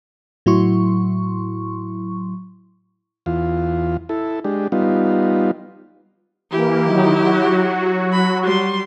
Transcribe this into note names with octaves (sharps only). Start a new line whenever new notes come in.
A2 F#3 E4 C6 C#6
E2 F4
E4 A4
G#3 D4 G4
G3 B3 D#4 F4
E3 A#3 E4 G4
D#3 F#3 D#4
F#3 F#4
B5
G3 C6